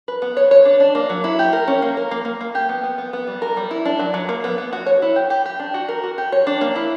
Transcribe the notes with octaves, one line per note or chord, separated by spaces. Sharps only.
B4
B3
C#5
C#5
D4
D4
A#3
F#3
E4
G4
A#4
C#4
A#3
A#4
A#3
A#3
A#3
G4
B3
B3
B3
B3
G3
A#4
G3
E4
D4
F#3
F#3
A#3
B3
B3
F#4
C#5
E4
G4
G4
G4
D4
F#4
A#4
F#4
G4
C#5
D4
A#3
E4